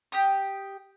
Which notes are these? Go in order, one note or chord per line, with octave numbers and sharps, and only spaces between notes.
G4 G5 D#6